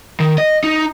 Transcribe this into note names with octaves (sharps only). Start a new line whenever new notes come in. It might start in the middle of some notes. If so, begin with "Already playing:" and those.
D#3
D#5
D#4